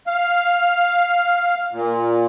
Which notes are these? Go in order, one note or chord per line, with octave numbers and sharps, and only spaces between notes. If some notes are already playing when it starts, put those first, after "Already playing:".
F5
A#2